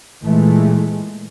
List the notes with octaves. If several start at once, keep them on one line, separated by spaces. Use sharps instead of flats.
A#2 E3 G#3 A3